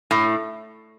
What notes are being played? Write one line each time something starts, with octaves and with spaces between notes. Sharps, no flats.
A2